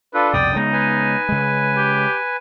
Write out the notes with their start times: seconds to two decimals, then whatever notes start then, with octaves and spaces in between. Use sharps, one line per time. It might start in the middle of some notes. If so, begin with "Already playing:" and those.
0.14 D4 F4 A4 B4
0.33 C2 F2 B2 D5 G5 D#6
0.56 C#3 G#3 B3 D#4
0.73 B4 G#5
1.29 C#3 G#3
1.77 G4